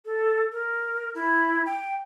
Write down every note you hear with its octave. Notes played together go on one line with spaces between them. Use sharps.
A4
A#4
E4
G5